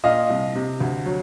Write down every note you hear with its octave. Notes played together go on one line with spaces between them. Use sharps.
A#2 D#5 F5
C2
C3
D2
F#3